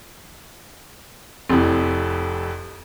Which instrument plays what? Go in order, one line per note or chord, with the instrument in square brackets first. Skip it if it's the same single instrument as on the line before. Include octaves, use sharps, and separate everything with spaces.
[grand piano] F1 F2 [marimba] C4 E4